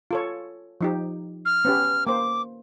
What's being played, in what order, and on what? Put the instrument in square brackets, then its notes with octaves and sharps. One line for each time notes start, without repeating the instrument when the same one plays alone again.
[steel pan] F4 A4 C#5
F3 D#4 G4
[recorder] F6
[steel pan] B3 C#4 G4
[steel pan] A#3 C5 [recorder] D6